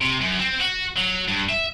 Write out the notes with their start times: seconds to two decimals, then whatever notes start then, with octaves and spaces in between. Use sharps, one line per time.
0.01 C3
0.21 F#2
0.39 C4
0.61 F#4
0.97 F#3
1.28 G2
1.49 E5